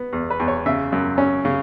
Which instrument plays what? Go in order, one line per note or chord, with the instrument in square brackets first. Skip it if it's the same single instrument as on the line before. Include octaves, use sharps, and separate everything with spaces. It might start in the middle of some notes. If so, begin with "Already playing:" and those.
Already playing: [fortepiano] B3
E2
B4
E2
C#5
C#3 E5
F#2
C#4
C#3